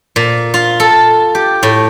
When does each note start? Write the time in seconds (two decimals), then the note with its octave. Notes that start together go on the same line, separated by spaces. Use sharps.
0.16 A#2
0.54 F4
0.80 A4
1.35 G4
1.63 A2